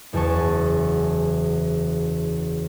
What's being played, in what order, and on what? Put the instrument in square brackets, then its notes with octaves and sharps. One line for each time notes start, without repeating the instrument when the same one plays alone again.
[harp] F#1 E2 G#5 A5 C#6